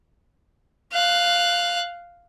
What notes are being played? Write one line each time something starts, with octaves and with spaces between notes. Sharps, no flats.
F5 F#6